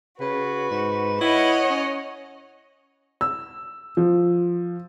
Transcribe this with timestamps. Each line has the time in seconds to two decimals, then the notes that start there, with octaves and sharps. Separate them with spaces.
0.20 C#3 F#4 B4
0.71 G#2
1.21 E4 C#5 D#5 F#5
1.70 C#4
3.21 E6
3.97 F3